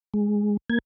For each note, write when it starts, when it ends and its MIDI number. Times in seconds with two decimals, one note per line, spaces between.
0.14 0.57 56
0.70 0.79 58
0.70 0.79 92